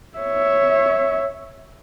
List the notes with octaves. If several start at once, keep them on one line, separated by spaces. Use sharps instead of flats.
C#5 E5